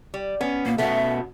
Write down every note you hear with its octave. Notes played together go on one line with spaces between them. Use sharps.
G3
B3 C#4
A#2 A#3
B2 A3 B3 C#4 F#4 E5